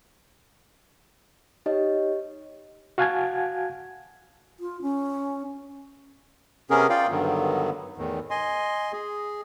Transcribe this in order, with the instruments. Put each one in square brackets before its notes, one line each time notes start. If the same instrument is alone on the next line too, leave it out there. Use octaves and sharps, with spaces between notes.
[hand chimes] D#4 G4 C#5 D#5
[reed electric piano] F#4 F5 F#5 G#5 A5 G#6
[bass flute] F4
C#4
[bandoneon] C3 B3 C#4 G#4 A#4
F4 D5 F5 G5
G2 D3 D#3 F#3 B3
E2 A2 D#3
D#5 G#5 C6
G#4